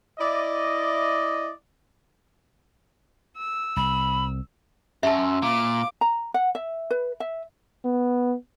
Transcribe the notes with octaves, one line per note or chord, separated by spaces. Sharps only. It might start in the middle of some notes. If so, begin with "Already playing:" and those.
E4 D5 D#5
E6
C2 B5
F#2 C#4 E5 A5 C6 E6
A#2 F5 D6
A#5
F#5
E5
B4
E5
B3